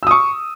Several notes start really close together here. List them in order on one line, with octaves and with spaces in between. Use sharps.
E6 D#6 C#6